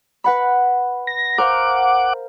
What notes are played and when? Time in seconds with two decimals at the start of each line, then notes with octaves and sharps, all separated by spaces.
0.24 B4 F#5 B5
1.07 A#6
1.38 A#4 C5 F5 F#5 D6